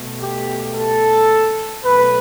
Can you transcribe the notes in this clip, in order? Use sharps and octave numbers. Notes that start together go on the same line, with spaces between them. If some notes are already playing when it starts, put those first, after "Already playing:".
Already playing: B2 A3
G4
A4
B2 F#3 A3 B4